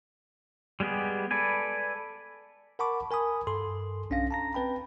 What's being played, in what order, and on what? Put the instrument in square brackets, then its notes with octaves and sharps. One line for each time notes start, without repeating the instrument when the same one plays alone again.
[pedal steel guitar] G3 G#3 B3 G4 G#4
A4 B4 D5 G#5
[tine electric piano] A#4 F#5 A5 B5 C#6 D6
A#4 G#5 B5 D#6
G2 A4 C6
B1 C#4 D4 F5 A#6
A5 A#5 A#6
C4 B4 G5 B5